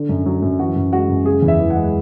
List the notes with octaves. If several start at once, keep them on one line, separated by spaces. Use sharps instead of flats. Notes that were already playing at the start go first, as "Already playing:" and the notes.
Already playing: D3
F#2
F#3
F#2
E3 F#4
F#2
G#3 F#4
F#2
C#3 G#4
E2
E5
E3
F#5
G#3